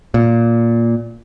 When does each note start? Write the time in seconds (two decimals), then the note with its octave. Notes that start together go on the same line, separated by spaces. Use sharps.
0.14 A#2